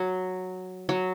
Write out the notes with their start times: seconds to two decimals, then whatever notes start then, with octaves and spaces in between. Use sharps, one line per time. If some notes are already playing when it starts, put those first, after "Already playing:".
Already playing: F#3
0.89 F#3